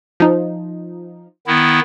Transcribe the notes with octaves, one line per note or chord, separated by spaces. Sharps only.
F3 D#4
D#3 B3 E4